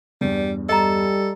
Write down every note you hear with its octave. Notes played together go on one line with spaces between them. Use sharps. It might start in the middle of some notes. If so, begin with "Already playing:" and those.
E2 G2 G3
G3 A4 D#5 A#5